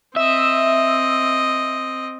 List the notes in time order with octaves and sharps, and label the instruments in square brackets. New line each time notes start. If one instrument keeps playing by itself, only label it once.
[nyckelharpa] C4 D#5 [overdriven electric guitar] E5